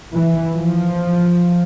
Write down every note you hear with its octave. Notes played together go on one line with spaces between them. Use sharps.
E3
F3